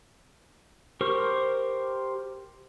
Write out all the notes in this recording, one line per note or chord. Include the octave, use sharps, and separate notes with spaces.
G4 A#4 C5 C#6